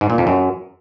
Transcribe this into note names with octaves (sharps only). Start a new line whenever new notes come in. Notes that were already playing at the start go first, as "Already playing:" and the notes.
G#2
A#2
F2
F#2